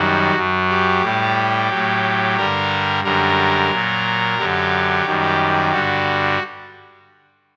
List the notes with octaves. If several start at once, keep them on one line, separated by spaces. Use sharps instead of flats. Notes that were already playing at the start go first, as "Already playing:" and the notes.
Already playing: F#2 D#3 G3 F#4
F#2 F#3
G4
A2 G3
A2 F#3
G2 D3 G3 A#4
F#2 D3 G3 A#4
A#2 F#3
F#2 D3 F#3 G4
F#2 D#3 G3
G2 D3 G3 F#4